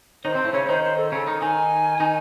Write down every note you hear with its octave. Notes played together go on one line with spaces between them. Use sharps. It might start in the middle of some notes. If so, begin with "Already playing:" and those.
D#3 D#4 C5 C#5
C3 C4
A2 A3
C#3 C#4 C#5
D#3 D#4 C5
C5
A4
C#3 C#4 A4
D#3 D#4
D#3 D#4 G#5
D#3 D#4